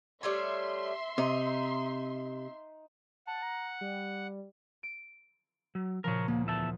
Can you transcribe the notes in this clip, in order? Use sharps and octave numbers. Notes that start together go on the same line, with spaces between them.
G3 A3 C#5 E5 C6
C3 D#4
F#5 A5
A#5
G3
D7
F#3
A#2 C#3 F3 A#4 C#5
D2 A#3
E2 E5 A5